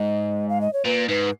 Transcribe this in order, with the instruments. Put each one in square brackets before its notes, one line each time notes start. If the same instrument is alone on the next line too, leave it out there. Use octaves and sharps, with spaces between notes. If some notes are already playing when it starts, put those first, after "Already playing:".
Already playing: [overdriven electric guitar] G#2 [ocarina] D#5
[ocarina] F5
D#5
C#5
[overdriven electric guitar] A#2 [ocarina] B4
[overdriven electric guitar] G#2 [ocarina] B4